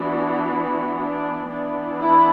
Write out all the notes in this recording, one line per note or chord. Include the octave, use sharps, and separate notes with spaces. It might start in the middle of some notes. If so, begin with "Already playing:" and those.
Already playing: E3 B3 D4 F#4
F#4
D4
E3 B3 D4
E4